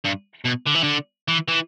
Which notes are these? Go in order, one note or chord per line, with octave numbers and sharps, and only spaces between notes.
G2
B2
D3
E3
D3
E3
E3